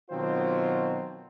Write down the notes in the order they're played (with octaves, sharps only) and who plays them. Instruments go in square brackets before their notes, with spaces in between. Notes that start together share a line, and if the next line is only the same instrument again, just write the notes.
[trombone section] B2 D#3 F#3 C4 F4 C5